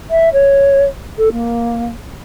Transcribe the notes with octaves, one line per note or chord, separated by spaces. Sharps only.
E5
C#5
A4
A#3